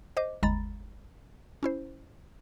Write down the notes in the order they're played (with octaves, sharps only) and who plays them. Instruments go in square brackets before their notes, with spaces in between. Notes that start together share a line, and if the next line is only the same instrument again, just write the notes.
[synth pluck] C5 D#5 D6
G1 D#2 G#3 A#5 B5 A6
C#4 E4 C5